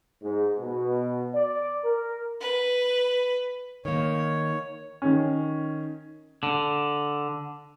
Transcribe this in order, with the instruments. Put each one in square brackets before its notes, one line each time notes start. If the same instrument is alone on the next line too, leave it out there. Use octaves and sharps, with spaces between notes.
[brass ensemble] G#2
B2
D5
A#4
[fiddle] B4
[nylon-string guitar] D#3 A#3 [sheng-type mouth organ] C#5
[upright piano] D#3 C#4
[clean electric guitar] D3